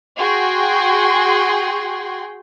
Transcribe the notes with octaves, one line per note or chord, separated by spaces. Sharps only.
F#4 G#4 G5 C6